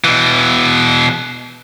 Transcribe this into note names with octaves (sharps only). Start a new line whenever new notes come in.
B2 E3